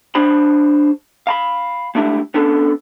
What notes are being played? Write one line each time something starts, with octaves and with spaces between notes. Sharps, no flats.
D4 G#4 C5 B5
F5 A#5 B5
G#3 A3 D4 E4 G4
B3 C#4 D4 A4